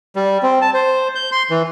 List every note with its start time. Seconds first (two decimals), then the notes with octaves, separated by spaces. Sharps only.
0.16 G3
0.43 C4
0.61 A5
0.74 C5
1.15 G6
1.32 C6
1.50 E3